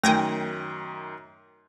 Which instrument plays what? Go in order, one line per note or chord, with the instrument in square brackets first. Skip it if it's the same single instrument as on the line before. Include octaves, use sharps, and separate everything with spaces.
[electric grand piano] F#2 D#3 [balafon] A3 [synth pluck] G5 G#5 A#6